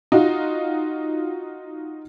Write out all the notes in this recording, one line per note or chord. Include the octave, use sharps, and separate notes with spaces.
D#4 F4 F#4